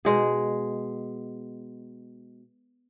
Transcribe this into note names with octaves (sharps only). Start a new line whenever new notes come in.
B2 G#3 G#4